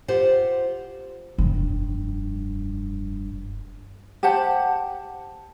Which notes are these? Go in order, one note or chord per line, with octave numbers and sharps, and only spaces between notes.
F4 G4 C5 F#5
F1 G2
G4 C5 F#5 A5